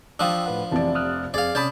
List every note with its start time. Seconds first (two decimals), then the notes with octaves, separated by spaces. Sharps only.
0.19 F3 D4 G5 D#6 E6
0.46 A2 B4 F#5
0.71 F1 C3 E3 D5 A5
0.95 D#6 F6 F#6
1.34 F2 C4 G#4 D5 F5
1.55 C3 C#4 D5 A5 B5 D#6 G6